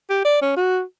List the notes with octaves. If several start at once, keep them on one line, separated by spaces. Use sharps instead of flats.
G4
D5
C#4
F#4